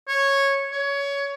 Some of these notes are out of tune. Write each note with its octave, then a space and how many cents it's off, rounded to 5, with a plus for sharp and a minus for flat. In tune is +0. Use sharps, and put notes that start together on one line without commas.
C#5 -10
C#5 +20